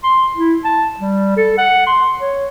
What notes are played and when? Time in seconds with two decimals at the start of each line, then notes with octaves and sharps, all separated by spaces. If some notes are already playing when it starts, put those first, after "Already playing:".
0.03 C6
0.36 E4
0.64 A5
1.00 G3
1.37 A4
1.58 F#5
1.87 C6
2.21 C#5